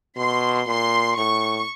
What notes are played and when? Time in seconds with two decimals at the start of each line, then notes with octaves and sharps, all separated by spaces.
0.17 B2 C6
0.67 A#2 C6
1.17 A2 C#6